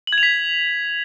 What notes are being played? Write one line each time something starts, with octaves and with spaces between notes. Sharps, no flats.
F#7
G#6
F7
B6